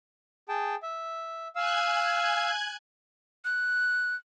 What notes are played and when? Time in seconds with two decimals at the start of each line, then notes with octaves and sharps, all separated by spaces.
0.49 G#4 G5 A5
0.83 E5
1.56 F5 G#5 E6 F#6 G#6
3.45 F#6